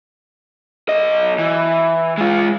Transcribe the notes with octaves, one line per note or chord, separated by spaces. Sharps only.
B1 D#5
E3
G#3 F4